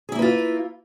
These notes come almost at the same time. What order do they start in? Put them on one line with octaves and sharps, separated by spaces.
G#4 E4 A#3 B4 F4